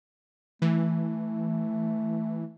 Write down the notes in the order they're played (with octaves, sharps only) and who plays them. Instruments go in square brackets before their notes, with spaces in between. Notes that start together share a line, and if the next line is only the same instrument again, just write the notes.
[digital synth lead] E3 [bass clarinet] A3